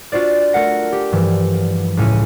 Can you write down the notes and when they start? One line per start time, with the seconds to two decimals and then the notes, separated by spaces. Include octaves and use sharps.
0.12 D4 F4 F#4 C5 D5
0.53 A3 A#4 F#5 A#6
0.92 G4
1.12 G2 E3 F3
1.97 C#2 A2 C#4 G#5